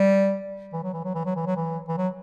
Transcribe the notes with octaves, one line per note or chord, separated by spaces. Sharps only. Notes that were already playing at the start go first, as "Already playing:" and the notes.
Already playing: G3
E3
F#3
E3
F#3
E3
F#3
E3
F#3
E3
E3
F#3